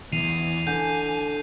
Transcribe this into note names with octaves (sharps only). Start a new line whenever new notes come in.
E2 E3 C7 D#7 F7
D3 G#5 G6